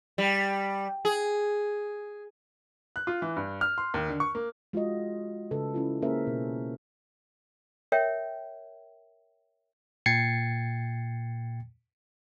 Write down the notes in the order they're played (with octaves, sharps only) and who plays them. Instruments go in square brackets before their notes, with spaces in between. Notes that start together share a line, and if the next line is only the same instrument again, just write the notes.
[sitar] G3
G#4
[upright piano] F#6
F4
E3
G2
F6
C6
D#2
D3
C#6
A#3
[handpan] G#3 F4 F#4 D#5
C#3 A4 B4
C#4 E4 F4
A#3 C#4 G#4 A#4 C5 E5
B2
[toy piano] A#4 C#5 E5 G5
[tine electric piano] A#2 G5 G#6 A6 C7 C#7